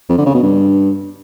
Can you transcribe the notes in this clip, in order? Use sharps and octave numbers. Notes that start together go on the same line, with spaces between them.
F2
D3
C#3
B2
G2